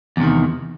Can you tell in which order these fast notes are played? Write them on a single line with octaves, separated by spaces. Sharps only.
E2 C3 D#3